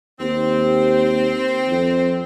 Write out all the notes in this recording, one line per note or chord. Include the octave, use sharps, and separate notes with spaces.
D#2 C4
F2